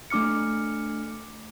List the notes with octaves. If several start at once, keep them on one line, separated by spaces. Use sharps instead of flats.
A3 D4 D6 F6 C#7